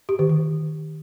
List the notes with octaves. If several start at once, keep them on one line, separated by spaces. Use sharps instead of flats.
G4
D#3
D#3